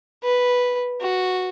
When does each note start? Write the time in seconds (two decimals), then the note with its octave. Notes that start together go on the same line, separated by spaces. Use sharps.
0.24 B4
1.01 F#4